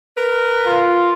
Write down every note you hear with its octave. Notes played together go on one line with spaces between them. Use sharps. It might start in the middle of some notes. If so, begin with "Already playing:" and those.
A#4 B4
F4